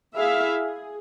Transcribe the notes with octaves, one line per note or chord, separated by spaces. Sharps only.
E4 G#4 E5 F5
G#4